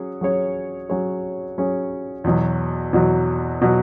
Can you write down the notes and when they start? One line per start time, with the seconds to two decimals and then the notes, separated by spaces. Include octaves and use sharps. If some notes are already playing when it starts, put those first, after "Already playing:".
Already playing: F#3 C#4 G#4 C#5
0.21 F#3 C#4 G#4 C#5
0.89 F#3 C#4 G#4 C#5
1.58 F#3 C#4 G#4 C#5
2.24 E2 B2 F#3
2.93 E2 B2 F#3
3.62 B2 F#3